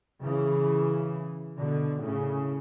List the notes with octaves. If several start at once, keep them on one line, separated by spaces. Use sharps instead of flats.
C#3 E3
B2 D3
A2 C#3